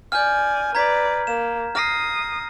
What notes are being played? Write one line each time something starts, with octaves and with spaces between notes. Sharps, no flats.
D5 G#5 F6 G6
B4 D5 A#5 G#6 B6
A#3 E7
D#6 F6 A#6 C7